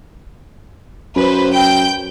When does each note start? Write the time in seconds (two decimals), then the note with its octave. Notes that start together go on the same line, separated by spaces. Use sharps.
1.16 F#2 B4 C5
1.53 G5 G6 D7